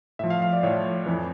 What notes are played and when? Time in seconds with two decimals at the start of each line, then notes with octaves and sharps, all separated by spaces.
0.19 A2 F3 E5
0.30 F5
0.42 F5
0.53 D5
0.63 A2 F3 C#5
1.06 F2 E3